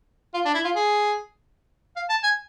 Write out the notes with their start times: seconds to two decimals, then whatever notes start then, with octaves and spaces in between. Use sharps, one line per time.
0.34 F4
0.45 D4
0.54 E4
0.65 F4
0.75 G#4
1.96 F5
2.10 A5
2.23 G#5